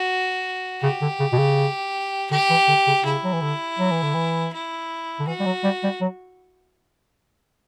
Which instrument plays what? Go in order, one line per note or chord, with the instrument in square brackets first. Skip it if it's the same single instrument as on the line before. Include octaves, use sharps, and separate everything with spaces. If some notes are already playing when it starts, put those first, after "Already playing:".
Already playing: [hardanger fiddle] F#4
[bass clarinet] C#3 [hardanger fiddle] G4
[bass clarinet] D3
C#3
B2
C#3
[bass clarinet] D3 [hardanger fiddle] G4
[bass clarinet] E3
D3
C#3
[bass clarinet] C#3 [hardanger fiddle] E4
[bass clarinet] F#3
E3
D3
F#3
E3
D3
E3
[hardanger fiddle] E4
[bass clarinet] D3
[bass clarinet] E3 [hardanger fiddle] F#4
[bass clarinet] G3
F#3
G3
G3
F#3